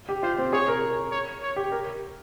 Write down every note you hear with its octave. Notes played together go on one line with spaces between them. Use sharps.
G4
F4 C5
C4
G#4 C#5
A#4
C#5
C#5
G4
A#4